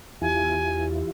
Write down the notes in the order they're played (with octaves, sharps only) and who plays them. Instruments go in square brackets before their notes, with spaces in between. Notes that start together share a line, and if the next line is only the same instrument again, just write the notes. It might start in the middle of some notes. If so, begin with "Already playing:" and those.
[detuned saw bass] E2 [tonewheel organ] E3 E4 F4 [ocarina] G4 [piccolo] G#5